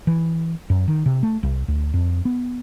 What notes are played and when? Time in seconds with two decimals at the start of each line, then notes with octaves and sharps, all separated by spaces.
0.07 E3
0.70 F#2
0.88 D#3
1.06 C3
1.23 A3
1.43 C2
1.68 D2
1.94 F2
2.25 B3